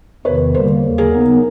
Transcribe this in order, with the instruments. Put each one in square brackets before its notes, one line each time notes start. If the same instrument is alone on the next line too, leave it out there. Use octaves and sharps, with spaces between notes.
[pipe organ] E2 C3 D#3 [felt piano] B4 C#5
[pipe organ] D3 G3 A#3 [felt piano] A#4 C5
[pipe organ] D#2 C#3 F#3 A#3
[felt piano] G#4 A#4
[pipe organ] C#3 F#3 B3 D#4